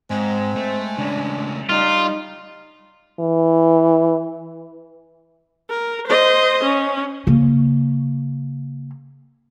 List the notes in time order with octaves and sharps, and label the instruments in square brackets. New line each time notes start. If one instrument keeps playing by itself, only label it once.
[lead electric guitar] G#2 [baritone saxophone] G#3 [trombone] C4
[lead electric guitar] A3
[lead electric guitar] C#3 A3 [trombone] D4
[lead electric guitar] G3 [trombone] D#4 [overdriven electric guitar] F4
[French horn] E3
[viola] A#4
C5 D#5
C#4
[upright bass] C#3 A#3